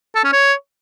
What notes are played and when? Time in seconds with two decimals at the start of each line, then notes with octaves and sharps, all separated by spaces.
0.15 A4
0.24 C#4
0.33 C#5